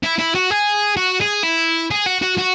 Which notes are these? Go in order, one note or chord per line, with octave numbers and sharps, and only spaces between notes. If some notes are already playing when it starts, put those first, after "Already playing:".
E4
E4
F#4
G#4
F#4
G#4
E4
G#4
F#4
F#4
F#4